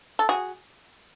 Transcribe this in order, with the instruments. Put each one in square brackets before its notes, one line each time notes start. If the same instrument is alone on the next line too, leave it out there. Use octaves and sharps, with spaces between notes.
[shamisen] A4
F#4 G#4